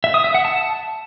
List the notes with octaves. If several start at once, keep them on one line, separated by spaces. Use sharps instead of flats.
E5
D#6
E5
F#5
A5